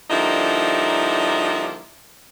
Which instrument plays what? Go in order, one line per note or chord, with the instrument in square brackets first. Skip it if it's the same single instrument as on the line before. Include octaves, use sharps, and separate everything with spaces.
[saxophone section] D3 F3 G3 A#3 D#4 E4